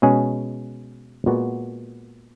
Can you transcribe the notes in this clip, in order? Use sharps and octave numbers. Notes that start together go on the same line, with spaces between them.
B2 G#3 C#4 G#4
A#2 G#3 B3 F#4